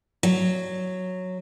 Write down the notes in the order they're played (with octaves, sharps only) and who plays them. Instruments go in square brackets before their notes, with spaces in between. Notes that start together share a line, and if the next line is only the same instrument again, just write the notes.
[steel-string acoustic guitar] F#3